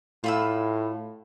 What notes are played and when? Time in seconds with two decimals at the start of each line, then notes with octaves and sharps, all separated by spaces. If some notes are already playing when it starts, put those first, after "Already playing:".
0.24 A2 F4 B5 E6